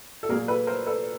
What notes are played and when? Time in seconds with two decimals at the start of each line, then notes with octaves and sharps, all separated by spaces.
0.23 A4
0.29 A#2 F#3 A#3 G#4 A#4
0.48 A4 B4
0.67 A#4 C5
0.86 A4 B4